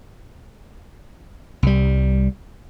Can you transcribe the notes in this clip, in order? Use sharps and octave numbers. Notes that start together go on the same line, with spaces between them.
C2 G3